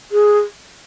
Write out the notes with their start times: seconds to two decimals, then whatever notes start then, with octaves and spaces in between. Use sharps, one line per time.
0.12 G#4